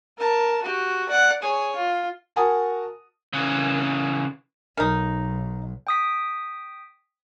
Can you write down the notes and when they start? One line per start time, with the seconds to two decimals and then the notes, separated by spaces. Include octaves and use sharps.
0.18 A#4 A5
0.62 F#4 G4
1.09 D5 F#5
1.42 G#4 C#5
1.75 F4
2.36 F#4 A#4 F#5 G#5 A5 D#6
3.33 C#3 E3
4.77 B1 D#3 D#4
5.87 G5 D#6 B6